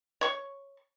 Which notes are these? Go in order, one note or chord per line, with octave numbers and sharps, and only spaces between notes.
C#5 C#6